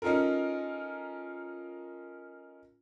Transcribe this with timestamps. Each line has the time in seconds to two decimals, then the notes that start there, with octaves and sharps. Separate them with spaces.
0.02 C#4 D#4 F4 A4 A#4